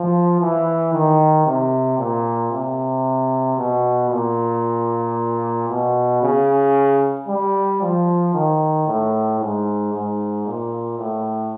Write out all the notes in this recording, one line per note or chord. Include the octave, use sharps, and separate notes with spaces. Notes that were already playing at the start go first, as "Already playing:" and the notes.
Already playing: F3
E3
D#3
C3
A#2
C3
B2
A#2
B2
C#3
G3
F3
D#3
A2
G#2
G#2
A#2
A2